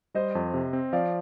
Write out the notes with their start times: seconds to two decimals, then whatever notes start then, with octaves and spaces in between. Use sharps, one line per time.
0.14 G3 C5 D#5
0.35 F2
0.54 C3
0.73 C4
0.93 F3 D5 F5